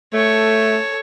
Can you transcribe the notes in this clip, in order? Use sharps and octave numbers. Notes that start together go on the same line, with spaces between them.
A3 A4 C#5